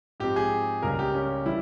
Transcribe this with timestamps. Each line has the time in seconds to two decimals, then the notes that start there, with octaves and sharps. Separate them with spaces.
0.20 G#2 F3 C4 G4
0.36 G#4
0.82 C#2 C#3 G3 A#3 A#4
0.99 G4
1.14 C#4
1.46 E3 G3 E4